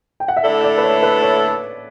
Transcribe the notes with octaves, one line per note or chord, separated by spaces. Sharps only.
G5
F#5
E5
D3 A3 E4 A4 D5
D5
B4
C#5
B4
C#5